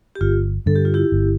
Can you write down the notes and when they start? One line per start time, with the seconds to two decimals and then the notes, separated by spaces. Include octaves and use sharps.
0.15 G4
0.21 G1 F4
0.66 G2 D3 A4
0.76 G4
0.85 F4
0.94 E4 G4
1.12 G1